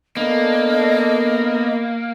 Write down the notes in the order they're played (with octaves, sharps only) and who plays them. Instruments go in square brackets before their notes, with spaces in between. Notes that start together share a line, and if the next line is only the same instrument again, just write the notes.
[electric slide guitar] A#3 [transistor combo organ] B3 [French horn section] D4 A4 [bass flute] D#5